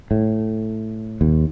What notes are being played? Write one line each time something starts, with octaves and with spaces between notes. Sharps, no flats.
A2
D#2